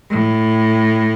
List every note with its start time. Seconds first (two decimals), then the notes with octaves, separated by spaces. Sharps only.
0.10 A2